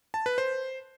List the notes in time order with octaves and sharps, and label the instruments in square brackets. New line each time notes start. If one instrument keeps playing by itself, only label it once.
[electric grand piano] A5
B4
C5